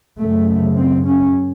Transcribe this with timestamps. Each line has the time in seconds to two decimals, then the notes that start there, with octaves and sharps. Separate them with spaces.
0.18 F#2 C#3 A3
0.77 C4
1.06 C#4